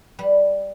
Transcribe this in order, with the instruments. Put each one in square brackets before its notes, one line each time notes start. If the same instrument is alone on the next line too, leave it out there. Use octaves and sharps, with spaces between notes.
[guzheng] G3 B4